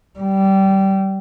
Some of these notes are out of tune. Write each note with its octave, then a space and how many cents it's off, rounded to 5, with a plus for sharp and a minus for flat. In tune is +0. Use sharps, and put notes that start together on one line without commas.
G3 -20